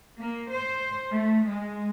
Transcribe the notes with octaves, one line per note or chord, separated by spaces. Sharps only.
A#3
C5
A3
G#3